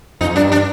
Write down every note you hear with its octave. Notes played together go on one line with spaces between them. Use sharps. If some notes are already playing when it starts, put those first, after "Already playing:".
F2 D#4
G2 D4
D4